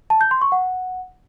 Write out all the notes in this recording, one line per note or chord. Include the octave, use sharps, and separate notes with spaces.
A5
G6
C6
C#6
F#5